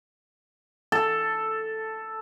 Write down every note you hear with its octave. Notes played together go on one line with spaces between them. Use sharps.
A4